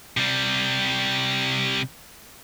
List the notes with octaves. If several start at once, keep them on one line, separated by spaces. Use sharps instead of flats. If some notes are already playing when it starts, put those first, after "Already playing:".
C3 G3